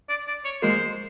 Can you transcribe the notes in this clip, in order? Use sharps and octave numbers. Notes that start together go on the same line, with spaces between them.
D5
D5
C#5
G#3 A#3 C5